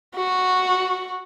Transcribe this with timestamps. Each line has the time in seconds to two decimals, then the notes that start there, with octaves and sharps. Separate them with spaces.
0.16 F#4